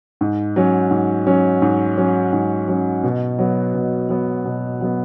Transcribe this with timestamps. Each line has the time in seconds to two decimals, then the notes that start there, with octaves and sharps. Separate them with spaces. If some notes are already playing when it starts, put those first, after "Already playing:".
0.21 G#2
0.56 F#3 C#4
0.91 G#2
1.27 F#3 C#4
1.62 G#2
1.97 F#3 C#4
2.33 G#2
2.68 F#3 C#4
3.03 B2
3.38 F#3 B3
3.74 B2
4.09 F#3 B3
4.45 B2
4.81 F#3 B3